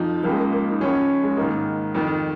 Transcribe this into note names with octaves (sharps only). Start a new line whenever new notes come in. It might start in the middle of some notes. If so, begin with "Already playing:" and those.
Already playing: F2 F3 D#4
C#2 C#3 F3 A#3
G#3
A#3
A#3
D#4
C#2 C#3 F3 C#4
G#3
G#2 D#3 A#3
F2 D#3